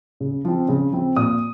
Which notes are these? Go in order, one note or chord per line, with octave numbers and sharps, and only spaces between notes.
C#3
F3 C4
C#3
F3 C4
A#2 D#6